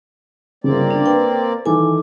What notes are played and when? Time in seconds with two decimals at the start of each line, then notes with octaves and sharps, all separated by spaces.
0.64 G1 C#3 A#3 C4 D5
0.91 D4
1.06 B4 G5
1.66 D#3 E3 A4 G#5 D6